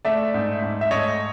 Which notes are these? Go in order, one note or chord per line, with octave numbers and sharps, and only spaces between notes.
A3 D5 E5
G#2
G#2
E5
A3 C#5 D#5